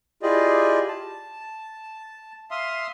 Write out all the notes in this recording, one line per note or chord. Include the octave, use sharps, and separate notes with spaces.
E4 F4 G4 G#4 D5 D#5
A5
E5 F5 C6 D#6